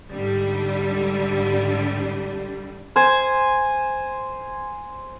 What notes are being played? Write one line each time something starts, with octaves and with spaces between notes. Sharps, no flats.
G#2 D3 G3
C5 G#5